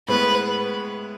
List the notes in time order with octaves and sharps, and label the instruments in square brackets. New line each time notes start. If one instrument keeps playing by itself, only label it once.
[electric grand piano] A2 G#3 B3 [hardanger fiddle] B4